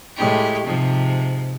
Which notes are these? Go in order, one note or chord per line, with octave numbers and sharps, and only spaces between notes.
A2 G#3 G4
G#2 C3 F3